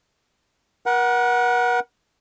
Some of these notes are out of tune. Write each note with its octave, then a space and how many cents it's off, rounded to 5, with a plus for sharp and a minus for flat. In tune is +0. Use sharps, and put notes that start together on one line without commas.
A#4 +45 F#5 +0